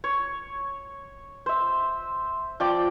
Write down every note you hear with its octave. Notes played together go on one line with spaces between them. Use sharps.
C#5
C5 E5
F3 D5 G5 D6